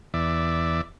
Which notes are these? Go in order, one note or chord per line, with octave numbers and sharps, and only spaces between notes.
E2 D5 E5